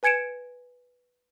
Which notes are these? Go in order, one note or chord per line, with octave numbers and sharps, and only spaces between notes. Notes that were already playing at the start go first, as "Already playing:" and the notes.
B4 G#5 G#6 C#7 D7 E7